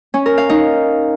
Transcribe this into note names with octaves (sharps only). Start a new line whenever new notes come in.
C#4
A#4
F5
D#4